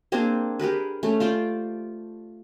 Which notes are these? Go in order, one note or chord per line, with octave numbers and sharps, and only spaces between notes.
A#3 C4 D4 G#4
G4 G#4 A#4 B4
A3 C#4
F4 C5 D5